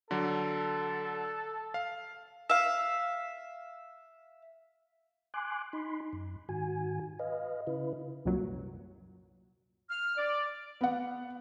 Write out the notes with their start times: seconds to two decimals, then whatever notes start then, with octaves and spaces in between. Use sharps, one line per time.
0.11 D3 F#3 A4
1.74 F5
2.50 E5 F5
5.34 G#5 C6 D6 F#6
5.73 D#4 B5 C6
6.13 F#2
6.49 G#2 D#3 F#4 G#5
7.19 B4 D#5 F5
7.67 C#3 E4 B4
8.25 C2 F#2 A#2 F#3
9.91 F6
10.17 D5
10.81 B3 F#5